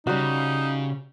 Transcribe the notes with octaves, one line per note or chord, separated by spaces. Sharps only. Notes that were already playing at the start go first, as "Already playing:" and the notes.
C#3 G3 D#4 F#4